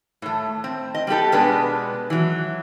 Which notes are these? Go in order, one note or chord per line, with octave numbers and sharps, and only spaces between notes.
A2 A3
C4
D#5
G3 B3 G4 A4
B2 G#3 B3 D4 B4
E3 F#3